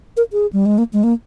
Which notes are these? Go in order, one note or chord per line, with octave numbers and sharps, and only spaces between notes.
A#4
G#4
G3
G#3
A#3
G#3
A#3